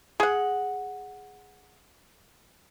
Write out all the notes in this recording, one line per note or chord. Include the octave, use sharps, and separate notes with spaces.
G#4 F#5